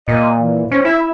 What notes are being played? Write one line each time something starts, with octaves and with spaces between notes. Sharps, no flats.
A#2 D#5
E3
C#4 C5
E4 E5